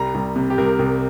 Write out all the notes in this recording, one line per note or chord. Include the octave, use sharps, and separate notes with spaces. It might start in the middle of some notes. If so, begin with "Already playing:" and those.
Already playing: C2 G3 A#5
C2
C3
G4
C2 A#4
C2